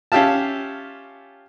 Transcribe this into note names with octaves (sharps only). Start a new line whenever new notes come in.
C#4 F4 G4 E5 F5 A5